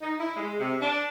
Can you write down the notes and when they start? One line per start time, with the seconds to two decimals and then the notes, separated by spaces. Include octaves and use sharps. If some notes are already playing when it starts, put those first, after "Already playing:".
0.02 D#4
0.19 E4
0.36 G#3
0.60 C3
0.81 D4